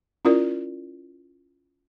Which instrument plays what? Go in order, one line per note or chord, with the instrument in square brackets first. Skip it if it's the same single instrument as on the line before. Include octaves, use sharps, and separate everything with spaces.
[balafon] C#4 E4 F4 A#4 D5